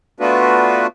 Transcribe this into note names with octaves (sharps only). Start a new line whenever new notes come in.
A3 B3 D4 F4 F#4 B4